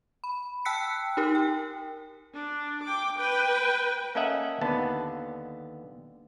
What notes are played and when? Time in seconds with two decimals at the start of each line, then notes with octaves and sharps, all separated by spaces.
0.24 B5
0.65 G5 A5 E6 F#6 B6 C#7
1.17 D#4 G4 A#4
1.35 G5
2.34 D4
2.83 G5 D6
3.19 B4 G5
4.15 A#3 C#4 A4 D#5 E5 F#5
4.61 D#2 D3 B3 A5